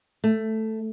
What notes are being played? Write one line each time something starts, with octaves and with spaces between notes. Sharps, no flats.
A3